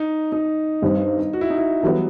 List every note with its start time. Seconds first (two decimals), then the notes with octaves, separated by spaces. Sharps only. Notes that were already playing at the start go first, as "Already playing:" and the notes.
Already playing: D#4
0.32 D#4
0.82 G2 D#3 G3 C4
1.33 F#4
1.41 E4
1.50 D#4
1.58 E4
1.83 E3 F#3 G3 B3